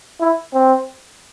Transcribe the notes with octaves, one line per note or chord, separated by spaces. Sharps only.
E4
C4